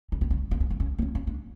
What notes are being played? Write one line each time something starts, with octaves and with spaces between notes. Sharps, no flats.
C#4
C4
C#4
C4
C#4
C4
C#4
C4
C#4
C#4
D4